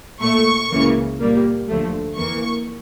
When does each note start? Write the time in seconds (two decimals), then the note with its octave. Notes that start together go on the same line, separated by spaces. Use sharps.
0.21 A#2 A3 C#6
0.70 C#2 C#3 E3 A#3
1.19 A#2 G3 A#3
1.68 D2 D3 F3 A3
2.16 F2 E3 A#3 C#6